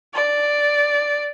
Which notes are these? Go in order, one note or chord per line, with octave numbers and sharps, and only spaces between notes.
D5